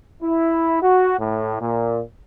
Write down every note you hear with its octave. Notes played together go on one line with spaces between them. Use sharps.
E4
F#4
A2
A#2